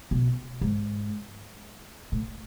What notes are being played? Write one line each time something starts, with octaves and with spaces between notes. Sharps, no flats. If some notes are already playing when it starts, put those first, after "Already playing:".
B2
G#2
A2